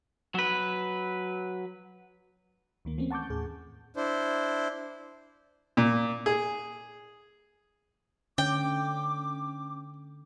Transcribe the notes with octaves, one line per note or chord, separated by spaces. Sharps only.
F#3 B4
D2 D#3 A#3
E3 A3 A#3 C4 C#4
F#5 A5 C#6 D6 G6
D#2 A2 G#4
D4 E4 C5
A#2
G#4
D3 C#4 G5 D6